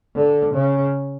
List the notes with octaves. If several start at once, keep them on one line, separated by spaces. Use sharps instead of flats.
D3
C#3